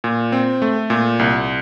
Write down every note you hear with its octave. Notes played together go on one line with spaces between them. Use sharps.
A#2
C4
A3
A#2
C2